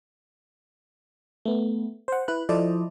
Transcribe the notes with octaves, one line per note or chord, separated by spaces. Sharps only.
A3 B3
C5 F#5
E4 B4 F#6
F3 E4 A4 C5 D5 D#5